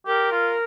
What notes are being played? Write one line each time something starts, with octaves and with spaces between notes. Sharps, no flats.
G4 A#4
F4